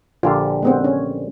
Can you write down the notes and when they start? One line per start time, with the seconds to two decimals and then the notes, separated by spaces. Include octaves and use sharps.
0.23 A#1 D3 F4 G4
0.62 G#3 B3 C4
0.84 C#4